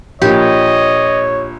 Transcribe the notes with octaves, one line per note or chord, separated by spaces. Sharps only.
A#1 A#2 G4 C#5 D#5